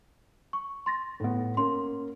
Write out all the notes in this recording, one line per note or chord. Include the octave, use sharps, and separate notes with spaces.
C#6
C6 A6 A#6
A2 B3
A#3 C#4 C6